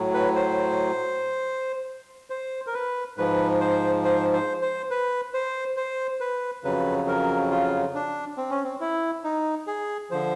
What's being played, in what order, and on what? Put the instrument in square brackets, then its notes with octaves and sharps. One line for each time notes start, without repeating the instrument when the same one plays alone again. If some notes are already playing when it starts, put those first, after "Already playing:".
Already playing: [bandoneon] A2 F#3
B4
C5
C5
A#4
B4
G#2 F3 B4
C5
C5
C5
C5
B4
C5
C5
B4
F2 C#3 F#3 B4
A#4
F4
D4
C4
C#4
C4
E4
D#4
G#4
D3 F3 C5